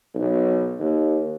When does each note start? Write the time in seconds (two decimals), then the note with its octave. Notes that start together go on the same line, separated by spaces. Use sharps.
0.15 B1
0.80 D#2